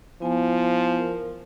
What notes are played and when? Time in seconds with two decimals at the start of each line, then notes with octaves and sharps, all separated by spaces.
0.22 F3 B3 E4 G#5
0.99 A#4